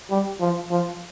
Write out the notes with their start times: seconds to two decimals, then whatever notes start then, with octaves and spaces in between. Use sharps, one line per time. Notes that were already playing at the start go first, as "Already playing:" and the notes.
0.10 G3
0.41 F3
0.70 F3